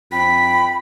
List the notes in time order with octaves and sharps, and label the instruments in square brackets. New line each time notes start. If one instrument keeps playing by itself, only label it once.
[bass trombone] F2 [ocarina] G5 [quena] B5 [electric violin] B6